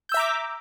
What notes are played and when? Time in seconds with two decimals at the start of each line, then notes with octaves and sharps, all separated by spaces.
0.09 G6
0.12 E6
0.14 E5
0.17 A#5
0.19 D6